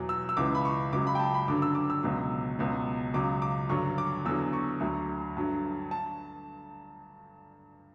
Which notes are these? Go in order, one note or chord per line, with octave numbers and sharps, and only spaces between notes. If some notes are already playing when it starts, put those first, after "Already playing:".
Already playing: E2 B2 F#3
E6
E6
C#2 C#3 E3 D6
B5
C#6
C#2 C#3 F#3 D6
B5
G5
A5
B5
G2 D3 F#3 D6
E6
D6
E6
C#2 B2 F#3
C#2 B2 F#3
C#2 C#3 F#3 D6
D6
G2 D3 F#3 C#6
D6
E2 D3 F#3 E6
C#6
D2 D3 F#3
G2 F#3
A5